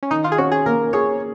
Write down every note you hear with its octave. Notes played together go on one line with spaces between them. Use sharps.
C#4
D#3 D#4
F4
G#4
C#4 F#4
G#4
A#3 A#4
G#4 C#5